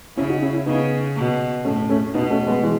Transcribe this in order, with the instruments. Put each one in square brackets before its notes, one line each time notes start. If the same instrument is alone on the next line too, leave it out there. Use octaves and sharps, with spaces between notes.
[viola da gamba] C#3 [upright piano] C#4 E4
[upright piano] D#4 F#4
C#4 E4
C#4 E4
[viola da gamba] C#3 [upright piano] B3 D#4
[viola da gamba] B2
[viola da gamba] A2 [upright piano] A3 C#4
[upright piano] A3 C#4
[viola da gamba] B2 [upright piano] B3 D#4
[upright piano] A3 C#4
G#3 B3
E3 G#3